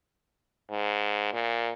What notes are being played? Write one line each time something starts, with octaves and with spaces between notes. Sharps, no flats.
G#2
A#2